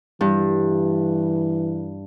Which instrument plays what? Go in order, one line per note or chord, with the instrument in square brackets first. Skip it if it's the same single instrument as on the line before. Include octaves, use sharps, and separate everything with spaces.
[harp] G2 [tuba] E3